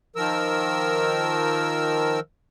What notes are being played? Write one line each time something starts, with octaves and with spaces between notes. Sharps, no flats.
D#3 F3 A#4 E6